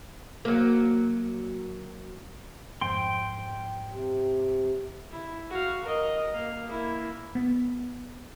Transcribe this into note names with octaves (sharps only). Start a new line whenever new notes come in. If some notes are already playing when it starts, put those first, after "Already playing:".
F#3 A#3
F2 G#2 G5 C6
C3
E4
F#4 F5
A#4 D#5
A#3 F5
A#3 E4
B3